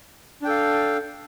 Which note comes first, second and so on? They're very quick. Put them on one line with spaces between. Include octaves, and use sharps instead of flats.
D4 G5 A4 F5